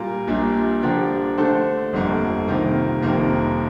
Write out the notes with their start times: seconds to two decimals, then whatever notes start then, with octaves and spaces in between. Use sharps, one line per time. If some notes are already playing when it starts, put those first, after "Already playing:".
Already playing: A#2 G3 A#3 F4
0.27 A#1 A#2 G3 A#3 D4
0.82 D3 F3 A#3 D4 G4
1.38 D3 A3 D4 A4 C5
1.93 G1 F2 D3 G3 A#3
2.47 C2 C3 D#3 A#3 F4
3.02 F1 F2 C3 D#3 A#3